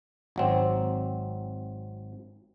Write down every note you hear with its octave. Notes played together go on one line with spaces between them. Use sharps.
G#1 F#3 C4